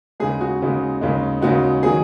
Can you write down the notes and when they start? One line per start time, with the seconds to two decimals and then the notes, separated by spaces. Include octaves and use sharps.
0.20 D#2 C#3 G#3 G#4
0.41 F#4
0.61 D#2 C#3 G#3
1.01 D#2 C#3 G#3
1.42 D#2 C#3 G#3 F#4
1.83 D#3 F#3 G#4